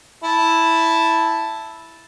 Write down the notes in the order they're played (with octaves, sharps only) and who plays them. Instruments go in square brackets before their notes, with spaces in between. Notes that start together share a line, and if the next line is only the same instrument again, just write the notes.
[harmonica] E4 A5